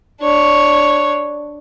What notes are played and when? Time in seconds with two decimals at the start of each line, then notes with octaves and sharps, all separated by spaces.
0.21 D4 C#5